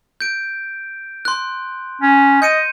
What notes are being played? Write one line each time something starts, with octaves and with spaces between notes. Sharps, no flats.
G6 D7
C6 F#6
C#4
D#5 G6 C#7 D#7